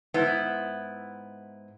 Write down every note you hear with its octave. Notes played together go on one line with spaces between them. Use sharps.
G#2 B3 E4